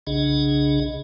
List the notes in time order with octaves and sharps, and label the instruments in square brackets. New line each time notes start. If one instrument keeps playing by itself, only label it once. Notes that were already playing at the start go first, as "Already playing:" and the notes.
[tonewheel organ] B1 C#3 D4 G#4 D#5